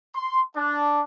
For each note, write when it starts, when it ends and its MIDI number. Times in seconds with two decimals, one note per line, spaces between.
0.15 0.42 84
0.56 1.02 62